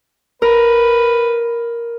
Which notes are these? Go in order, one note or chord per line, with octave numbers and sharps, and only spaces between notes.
A#4 B4